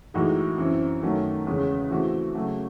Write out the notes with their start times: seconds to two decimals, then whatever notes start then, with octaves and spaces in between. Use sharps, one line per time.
0.14 A2 E3 G#3 D#4 F#4
0.58 F#2 E3 C4 E4
1.02 F#2 D#3 F#3 A3 C#4
1.47 E2 C#3 G#3 C#4
1.91 E3 A3 C4 F#4
2.35 C#3 F#3 A3